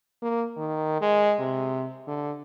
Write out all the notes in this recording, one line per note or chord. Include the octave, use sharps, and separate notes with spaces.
A#3
D#3
G#3
C3
D3